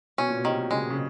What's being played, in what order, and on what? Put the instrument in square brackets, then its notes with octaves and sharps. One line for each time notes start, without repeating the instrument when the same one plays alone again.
[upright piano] B2 [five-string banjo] C#4
[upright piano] A#2
B2
[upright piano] C3 [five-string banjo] D#3
[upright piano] C#3 [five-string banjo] G#3
[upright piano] C#3